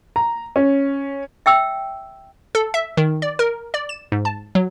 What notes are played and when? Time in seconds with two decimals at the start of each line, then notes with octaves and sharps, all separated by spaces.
0.16 A#5
0.56 C#4
1.46 E5 G5 E6
2.55 A4
2.74 E5
2.97 D#3
3.22 D5
3.39 A#4
3.74 D5
3.89 E7
4.12 G#2
4.25 A5
4.55 F#3